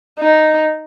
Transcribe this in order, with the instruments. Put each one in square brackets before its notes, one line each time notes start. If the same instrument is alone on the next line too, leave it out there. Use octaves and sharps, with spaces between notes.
[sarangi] D#4